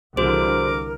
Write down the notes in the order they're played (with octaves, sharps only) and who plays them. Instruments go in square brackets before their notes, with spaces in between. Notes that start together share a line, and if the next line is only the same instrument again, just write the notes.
[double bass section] C2 D3 E3 [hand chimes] F#4 G#4 C5 [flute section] A#4 [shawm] D6